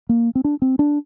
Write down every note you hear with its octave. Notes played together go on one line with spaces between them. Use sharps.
A#3
C4
D4
C4
D4